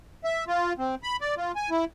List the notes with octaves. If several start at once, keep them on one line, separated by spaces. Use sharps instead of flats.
E5
F4
C4
B5
D5
F4
G#5
E4